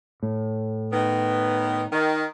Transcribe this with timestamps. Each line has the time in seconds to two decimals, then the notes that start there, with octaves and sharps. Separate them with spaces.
0.23 A2
0.93 D#3 B3
1.92 D#3